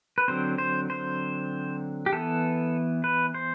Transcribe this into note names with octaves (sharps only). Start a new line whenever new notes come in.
B4
D3 F#3 C4 C5
C5
C5
G4
E3 B3 A4
B4
C5